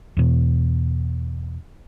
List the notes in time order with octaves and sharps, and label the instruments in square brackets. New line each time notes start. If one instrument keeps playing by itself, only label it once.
[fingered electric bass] E2 B2